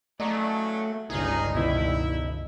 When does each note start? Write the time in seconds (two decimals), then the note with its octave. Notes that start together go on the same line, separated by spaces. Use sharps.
0.20 C#3 E3 F#3 A3 D5 D#5 A#5
1.10 G1 C#2 G2 D#3 C#4 D#4 G#4
1.55 B2 D#3 E4